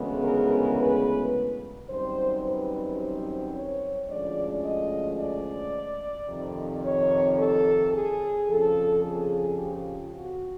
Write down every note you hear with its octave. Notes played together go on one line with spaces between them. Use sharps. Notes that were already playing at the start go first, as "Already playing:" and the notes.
Already playing: D2 C#3 E3 G#3 B3
A#4
B4
F#2 D#3 G3 C4 C5
B4
C5
C#5
D2 D3 F3 G#3 C#4 D5
D#5
D5
F2 C3 D#3
C#5
A4
G#4
F2 C#3 F3 A4
G#4
G4
F#4